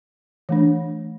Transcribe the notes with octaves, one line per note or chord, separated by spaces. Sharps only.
E3 A3 D4